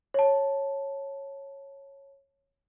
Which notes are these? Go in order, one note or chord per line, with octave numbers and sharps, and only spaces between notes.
C#5 A5